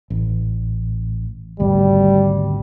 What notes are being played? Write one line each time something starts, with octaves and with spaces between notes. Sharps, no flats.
A1
G#1 D2 B2 G3